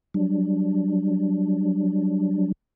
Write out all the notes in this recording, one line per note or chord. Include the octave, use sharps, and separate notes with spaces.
F#3 G3 D4